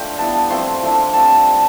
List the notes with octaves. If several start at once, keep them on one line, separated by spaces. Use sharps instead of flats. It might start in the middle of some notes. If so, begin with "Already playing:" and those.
Already playing: A3 D4 F4 G5
G3 B3 E4 A5
F3 A3 C4 E4 C6
F3 A3 D4
G3 C4 F4 A5